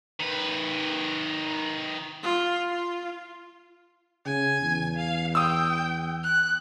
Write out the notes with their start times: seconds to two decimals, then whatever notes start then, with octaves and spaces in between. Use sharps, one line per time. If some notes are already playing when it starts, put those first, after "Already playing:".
0.20 D#3 B4
2.23 F4
2.69 F4
4.26 C#3 G#5
4.61 E2
4.97 F5
5.35 G5 D#6 E6
6.24 F#6